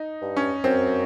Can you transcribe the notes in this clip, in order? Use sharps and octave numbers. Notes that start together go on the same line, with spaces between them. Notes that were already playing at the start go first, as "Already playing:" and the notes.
Already playing: D#4
G2
C#4
F#2 C4